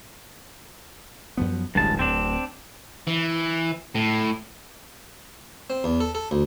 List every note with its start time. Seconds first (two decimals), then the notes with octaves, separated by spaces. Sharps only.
1.37 F#2 F3 B3
1.75 D1 A1 G2 G#3 A5
1.99 D1 C4 D4
3.07 E3
3.95 A2
5.70 C4
5.84 E2
6.01 A4
6.15 A4
6.31 D2